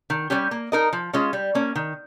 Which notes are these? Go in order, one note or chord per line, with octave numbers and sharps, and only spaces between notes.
D#3
G3 C#4 G4
A#3
D#4 A#4 D#5
F3
G#3 C#4 F4
G3
A#3 C#4
D#3